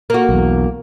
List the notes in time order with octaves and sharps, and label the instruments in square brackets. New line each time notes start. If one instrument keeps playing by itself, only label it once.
[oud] A#3 F#4
[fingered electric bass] B1 E2